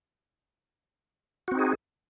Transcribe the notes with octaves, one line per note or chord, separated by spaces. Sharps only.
C4 D#4 F#4 G#4